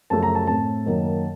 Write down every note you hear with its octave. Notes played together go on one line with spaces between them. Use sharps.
F#2 C#3 F3 A3 A5
A#5
A5
A2 A3 C4 A5
F#2 D#3 F#3 A#3